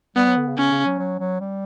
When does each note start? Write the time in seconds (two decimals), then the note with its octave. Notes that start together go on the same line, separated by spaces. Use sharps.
0.16 G3 B3
0.27 F#3
0.37 D3
0.47 C#3
0.57 C#3 C#4
0.71 C#3
0.85 F#3
0.99 F#3
1.20 F#3
1.40 G3